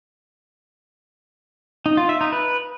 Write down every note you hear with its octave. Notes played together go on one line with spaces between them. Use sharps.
D#4
F4
E5
D#4
B4